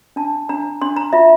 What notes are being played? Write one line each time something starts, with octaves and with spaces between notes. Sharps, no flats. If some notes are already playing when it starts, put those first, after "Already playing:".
D4 A5
D4 A#5
D4 C6
A#5
F4 E5